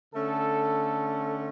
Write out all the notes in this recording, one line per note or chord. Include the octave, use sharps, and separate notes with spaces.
D3 A3 C#4 A4